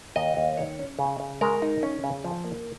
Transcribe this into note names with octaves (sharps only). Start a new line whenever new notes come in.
D#2 D#5
D#2
D#3 C#5
C#4
C#3
C#3
G#3 A#4
D#4
C#4
C#3
F3
A#3